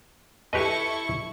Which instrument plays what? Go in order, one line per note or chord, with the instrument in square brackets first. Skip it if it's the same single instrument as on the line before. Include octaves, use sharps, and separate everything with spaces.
[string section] E4 C#6 [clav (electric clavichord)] G4 B4 D#5 [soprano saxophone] A4